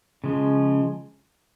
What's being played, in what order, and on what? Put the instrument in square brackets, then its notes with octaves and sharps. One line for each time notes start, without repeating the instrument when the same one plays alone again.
[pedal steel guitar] C#3 F3 G#3